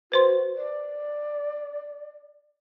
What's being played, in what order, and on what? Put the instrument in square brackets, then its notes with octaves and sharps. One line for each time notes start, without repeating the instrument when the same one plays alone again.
[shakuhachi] F#4 [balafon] B4 C5 C6
[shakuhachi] D5